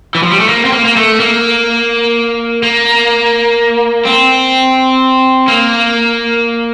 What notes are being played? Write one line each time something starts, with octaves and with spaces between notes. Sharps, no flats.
E3
F3
G3
A3
A#3
C4
A#3
A#3
A3
A#3
A#3
C4
A#3